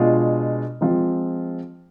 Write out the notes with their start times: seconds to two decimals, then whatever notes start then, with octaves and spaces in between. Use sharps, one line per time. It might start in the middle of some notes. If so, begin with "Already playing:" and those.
Already playing: B2 G#3 D4 F4
0.81 F3 G#3 C4 F4